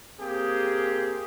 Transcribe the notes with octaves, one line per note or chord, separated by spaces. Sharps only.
A#3 C4 G4 G#4